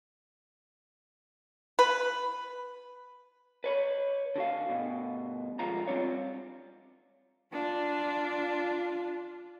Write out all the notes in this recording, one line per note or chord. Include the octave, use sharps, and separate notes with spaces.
B4
B4 C#5 B5
D3 F#4 F5
G2 B2
D2 G2 F3 G#3 F4 A#5
G3 C4 D4 F4 C#5
D4 F4